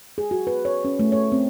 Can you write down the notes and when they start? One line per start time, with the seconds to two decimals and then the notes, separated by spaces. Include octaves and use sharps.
0.18 G#4
0.31 F#4
0.47 B4
0.65 C#5
0.85 C#4
0.99 A3
1.12 C#5
1.32 C4